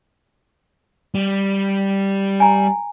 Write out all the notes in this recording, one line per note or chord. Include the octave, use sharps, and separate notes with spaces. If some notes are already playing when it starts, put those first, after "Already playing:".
G3
G#5 A#5